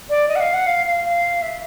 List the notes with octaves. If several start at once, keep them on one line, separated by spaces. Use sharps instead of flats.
D5
D#5
F#5
F5
F#5
F5
F5
F5
E5